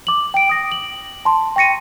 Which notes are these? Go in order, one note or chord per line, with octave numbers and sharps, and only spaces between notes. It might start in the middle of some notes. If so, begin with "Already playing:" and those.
D6 F#7
G5 D7
D#6 A#6
F#7
A5 C6
G5 C#6 A#6 C#7 D#7